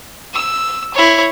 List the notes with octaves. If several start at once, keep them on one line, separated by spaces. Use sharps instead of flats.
E6
E4 C#5